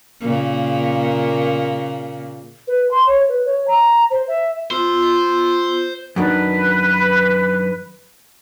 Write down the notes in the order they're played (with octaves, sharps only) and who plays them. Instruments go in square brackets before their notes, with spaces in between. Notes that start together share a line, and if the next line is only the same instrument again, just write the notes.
[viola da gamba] A#2 C#3 A#3
[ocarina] B4
C6
C#5
B4
C#5
A#5
C5
E5
[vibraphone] B3 F4 E6 [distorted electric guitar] C5
[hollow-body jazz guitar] F#2 D#3 D4 [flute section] B4